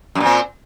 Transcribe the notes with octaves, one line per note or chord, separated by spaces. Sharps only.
F#2 A#2 C4